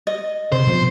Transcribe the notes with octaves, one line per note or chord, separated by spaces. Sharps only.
D#5
C3 C5
B2 F3